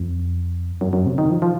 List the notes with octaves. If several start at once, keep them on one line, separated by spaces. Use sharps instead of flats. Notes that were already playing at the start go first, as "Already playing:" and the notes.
Already playing: F2
F#2
F#2
C3
D#3
F3
F3